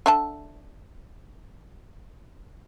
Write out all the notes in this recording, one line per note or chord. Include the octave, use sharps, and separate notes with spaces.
D3 E5 A5